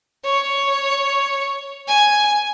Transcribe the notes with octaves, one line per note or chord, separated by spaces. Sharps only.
C#5
G#5